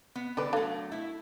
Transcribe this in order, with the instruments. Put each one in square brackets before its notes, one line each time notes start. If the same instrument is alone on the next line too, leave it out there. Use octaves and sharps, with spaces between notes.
[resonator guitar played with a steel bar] B3
[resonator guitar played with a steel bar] D3 D5 [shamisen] G3 G4 B4
[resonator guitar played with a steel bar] F#3 A3 [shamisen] D4 A4 F5
[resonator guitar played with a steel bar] A3 E4